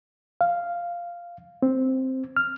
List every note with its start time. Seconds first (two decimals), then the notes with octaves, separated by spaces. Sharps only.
0.41 F5
1.62 C4
2.37 F6